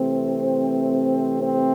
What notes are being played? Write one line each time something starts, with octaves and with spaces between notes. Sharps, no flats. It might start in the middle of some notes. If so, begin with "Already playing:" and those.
Already playing: C3 E3 A3 C4
C4